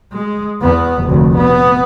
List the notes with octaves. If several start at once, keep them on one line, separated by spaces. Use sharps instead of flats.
G#3
E2 B3
F1 D2
B3